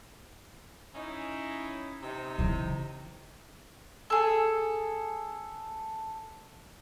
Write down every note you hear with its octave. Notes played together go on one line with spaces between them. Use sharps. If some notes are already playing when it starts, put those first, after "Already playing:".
C#4 D#4 E4
C3 D#4
C#3 E3
G#4 A4